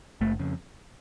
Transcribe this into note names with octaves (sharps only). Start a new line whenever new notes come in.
F#1 A3
F2 C#3